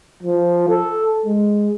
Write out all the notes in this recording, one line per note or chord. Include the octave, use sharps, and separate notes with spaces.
F3
A4
G#3